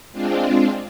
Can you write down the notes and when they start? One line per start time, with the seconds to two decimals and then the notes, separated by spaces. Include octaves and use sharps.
0.13 G#3 C4 D4 F4